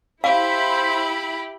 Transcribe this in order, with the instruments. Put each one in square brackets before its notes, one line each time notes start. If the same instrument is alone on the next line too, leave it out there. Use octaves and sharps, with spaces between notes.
[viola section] E4 B5 [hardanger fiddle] G4 [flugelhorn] C5 [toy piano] F5